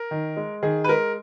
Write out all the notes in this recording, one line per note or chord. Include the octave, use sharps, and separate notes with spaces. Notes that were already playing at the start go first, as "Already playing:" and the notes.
Already playing: A#4
D#3
G#3
D#3 G#4
B4
G#3 A#4